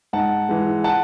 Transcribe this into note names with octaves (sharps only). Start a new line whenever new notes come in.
G#2 F#5 A5
E3 G#3
F#5 A5